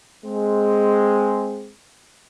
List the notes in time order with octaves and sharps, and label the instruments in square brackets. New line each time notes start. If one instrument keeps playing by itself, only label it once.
[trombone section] G#3 C4